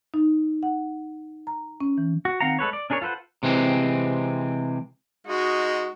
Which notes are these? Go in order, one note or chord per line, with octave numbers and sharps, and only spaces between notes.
D#4
F#5
A#5
C#4
E3
F#4
D#3 C4 F5 F#5 A#5
G#3 A4 B4 C#5
D5
C#4 D4 G#4 A#4 C#5
F4 A4 B4 C5 F#5
C3 E3 G#3 C4
G#3 D#4 F#4